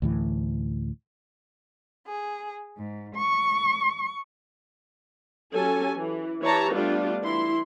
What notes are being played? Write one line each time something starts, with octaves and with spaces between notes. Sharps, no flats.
D2 A2 E3
G#4
G#2
C#6
F#3 C#4 G4 A4 G#5
E3
E3 G4 C#5 A5 A#5
G3 A3 B3 D4 F4
E3 E4 C6